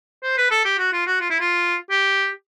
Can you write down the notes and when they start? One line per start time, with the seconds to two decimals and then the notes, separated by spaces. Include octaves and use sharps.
0.23 C5
0.38 B4
0.51 A4
0.65 G4
0.79 F#4
0.93 F4
1.07 F#4
1.21 F4
1.30 E4
1.40 F4
1.90 G4